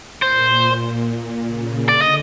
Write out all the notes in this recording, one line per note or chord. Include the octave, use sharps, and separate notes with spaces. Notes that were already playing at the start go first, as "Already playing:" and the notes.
A#2 C5
C#3
D3 D5
D#5